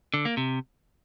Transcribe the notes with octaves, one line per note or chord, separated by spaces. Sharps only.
D3
A#3
C3